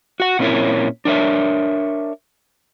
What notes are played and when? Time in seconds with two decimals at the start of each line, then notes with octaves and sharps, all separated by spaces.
0.20 F#4 F#5
0.39 A#2 C4 C#4 E4 A#4 C#5
1.05 D4 A#4 C#5 E5